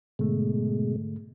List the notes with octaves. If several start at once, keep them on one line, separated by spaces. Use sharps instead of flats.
G#2 B2 D3 G#3 A3